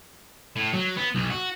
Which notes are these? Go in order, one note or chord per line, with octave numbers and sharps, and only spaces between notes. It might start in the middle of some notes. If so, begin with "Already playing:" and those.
A2
F#3
B3
B1
F#4